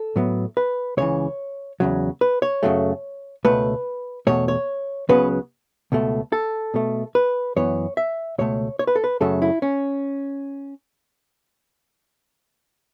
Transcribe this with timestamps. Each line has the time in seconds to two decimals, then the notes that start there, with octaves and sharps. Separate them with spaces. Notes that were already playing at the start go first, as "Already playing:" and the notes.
Already playing: A4
0.16 A2 F#3 B3
0.57 B4
0.97 C#2 C#3 E3 C#5
1.80 E2 C#3 F#3
2.21 B4
2.42 C#5
2.63 F#2 C#3 F#3 A3
3.45 C#2 B2 A3 B4
4.27 E2 B2 A3 C#5
4.48 C#5
5.09 C#2 C#3 F#3 B3 B4
5.92 C#2 B2 A3
6.32 A4
6.74 B2 A3
7.15 B4
7.56 F#2 E3 B3 C#5
7.97 E5
8.38 C#2 B2 A3 C#5
8.79 C#5
8.87 B4
8.96 A4
9.04 B4
9.20 F#2 C#3 F#3 A3 A4
9.42 E4
9.62 C#4